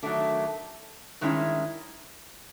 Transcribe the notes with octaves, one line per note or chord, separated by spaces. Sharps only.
D#3 F#3 A3 D4
G2 D#3 G#3 C#4 E4